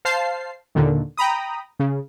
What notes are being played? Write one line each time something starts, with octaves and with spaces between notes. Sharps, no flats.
C5 F5 A5 C7
D#2 A#2 D3 D#3
G5 A#5 B5 D#6
C#3